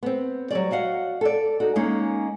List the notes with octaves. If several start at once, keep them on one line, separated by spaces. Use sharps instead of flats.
B3 C4
F#3 G3 D5
F#4 D#5 F5 F#5
A4 D5
D#4 F#4
G#3 A#3 C#4 D#4